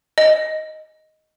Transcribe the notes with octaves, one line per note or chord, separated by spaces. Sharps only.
D#5